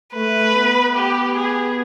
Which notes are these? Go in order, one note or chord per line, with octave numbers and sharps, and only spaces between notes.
A3 B4
B3
G4
G#4